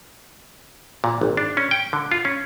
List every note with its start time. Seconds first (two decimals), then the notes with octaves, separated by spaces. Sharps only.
1.04 A#2
1.21 G#1
1.37 D4
1.57 C#4
1.71 G5
1.93 D3
2.12 F4
2.25 C#4